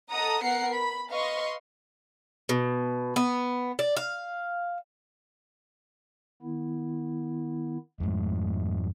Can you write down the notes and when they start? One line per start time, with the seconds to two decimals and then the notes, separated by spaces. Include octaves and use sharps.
0.12 A4 D#5 F#5 A#5 D#6
0.44 B3 A#4 F#5 C7 C#7
0.76 B5
1.12 B4 D#5 F5 C6 C#6
2.49 B2
3.16 B3
3.79 D5
3.97 F5
6.42 D#3 B3 E4
8.00 F2 G#2 G#3 A3